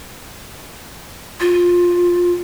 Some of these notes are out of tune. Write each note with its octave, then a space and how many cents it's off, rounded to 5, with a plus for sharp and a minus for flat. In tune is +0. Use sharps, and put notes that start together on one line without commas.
F4 +15